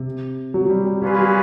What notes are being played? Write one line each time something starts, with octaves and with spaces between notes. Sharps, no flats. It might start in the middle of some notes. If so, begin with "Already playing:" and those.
Already playing: C3
F#3
F#3
G3
G3
G3 A#3 C#4 F4 G#4 B4
F#3